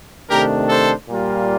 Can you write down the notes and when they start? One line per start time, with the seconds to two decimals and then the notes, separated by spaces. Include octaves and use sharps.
0.29 C3 D#3 A3 D4 G4 A#4
0.69 A4 C5
1.08 A#2 G3 A#3 F4